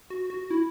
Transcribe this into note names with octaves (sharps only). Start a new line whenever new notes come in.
F#4
F#4
E4